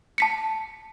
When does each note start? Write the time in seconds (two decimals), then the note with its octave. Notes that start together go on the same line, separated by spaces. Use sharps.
0.18 A5 B6 C#7